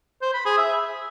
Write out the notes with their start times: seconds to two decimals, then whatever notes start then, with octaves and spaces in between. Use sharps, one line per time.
0.22 C5
0.34 B5
0.46 G#4
0.58 E5